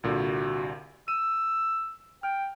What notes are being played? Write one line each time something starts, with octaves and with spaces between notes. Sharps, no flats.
C2 A#2 D3 F#4
E6 D#7
G5 F6